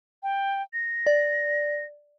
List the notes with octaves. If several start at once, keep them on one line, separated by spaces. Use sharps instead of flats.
G5
A#6
D5